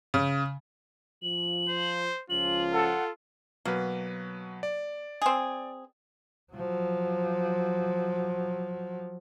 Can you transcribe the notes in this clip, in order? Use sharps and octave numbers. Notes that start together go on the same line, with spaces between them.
C#3
F3 F#7
C5
C#2 F3 C#4 F4 F#7
A4 F#5
B2 F#3 A#3 B4
D5
C4 G#4
F3 F#3